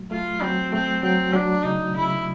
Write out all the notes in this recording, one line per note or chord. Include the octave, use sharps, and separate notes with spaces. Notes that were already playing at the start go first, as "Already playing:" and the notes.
Already playing: F#3 A3
A3 F4
F#3 C4
A3 C4
F#3 C4
F#3 D4
C#3 D#4
C#3 E4